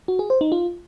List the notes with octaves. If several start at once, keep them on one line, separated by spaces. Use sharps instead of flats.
F#4
G#4
C5
D#4
F4